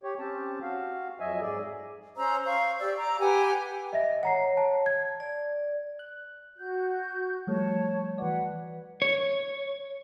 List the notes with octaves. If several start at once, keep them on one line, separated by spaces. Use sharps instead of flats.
G4 C#5
C4 C#4 G4 A5
F#4 F5
F2 F#3 D#5 E5 G#5
G#2 G#4 D5
C#4 C5 A#5 E6
C5 F5 C#6
G4 D5 E6
A#5 D6
G4 B4 F#5 G#5
D#5 E5 A#6
C#5 F#5 A#5 C7
A5
G#6
D5
F#6
F#4 G6
F3 G3 A3 C#5 A5
E3 F#4 B4 D5 F#5
C#5